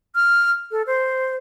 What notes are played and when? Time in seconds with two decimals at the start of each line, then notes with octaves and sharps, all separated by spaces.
0.15 F6
0.72 A4
0.87 C5